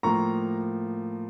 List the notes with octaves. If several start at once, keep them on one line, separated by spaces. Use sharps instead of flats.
A2 F3 A#3 A#5 C#6